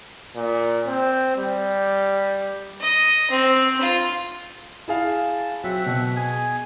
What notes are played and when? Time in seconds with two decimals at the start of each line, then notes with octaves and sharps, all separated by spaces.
0.36 A#2
0.86 C4
1.37 G3
2.80 D#5
3.30 C4
3.80 F4
4.88 E4 G#4 F5 A5
5.64 F#3 C4 E5 F#5
5.86 B2
6.16 G#4 G#5